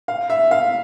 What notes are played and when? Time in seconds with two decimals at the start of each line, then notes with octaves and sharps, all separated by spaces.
0.08 F5
0.30 E5
0.51 F5